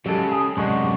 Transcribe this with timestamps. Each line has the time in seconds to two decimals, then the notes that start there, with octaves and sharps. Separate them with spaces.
0.06 C#3 F#3 G#3 G4 A4
0.32 G#4
0.57 F#2 A2 C3 G#3 D4 F#4